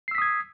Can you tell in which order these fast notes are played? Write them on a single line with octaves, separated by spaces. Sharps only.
C7 E6 B6 D#6 G#6